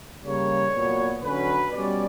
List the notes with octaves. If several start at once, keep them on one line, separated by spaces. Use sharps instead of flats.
C#3 G3 A#3 C#5
A#2 F#3 B3
D3 F#3 C#4 B4
B2 G3 C#4 D5